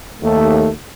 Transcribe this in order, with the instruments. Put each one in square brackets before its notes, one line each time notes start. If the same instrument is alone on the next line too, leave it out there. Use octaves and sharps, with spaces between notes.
[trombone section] D#2 A3